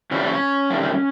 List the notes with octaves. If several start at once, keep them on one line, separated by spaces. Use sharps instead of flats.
C3 E3 G3 C#4
D4
C#4
C3 D#3 G3